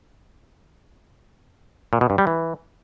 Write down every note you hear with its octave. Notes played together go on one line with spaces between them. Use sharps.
A#2
B2
G2
G3
E3